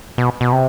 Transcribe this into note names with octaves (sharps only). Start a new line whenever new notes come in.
B2
B2
C3